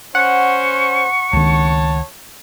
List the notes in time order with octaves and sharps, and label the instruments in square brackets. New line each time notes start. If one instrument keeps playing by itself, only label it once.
[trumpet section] C#4 C5 [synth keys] F#5 [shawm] C#6
[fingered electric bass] C#2 D#3 [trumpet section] C#5 A5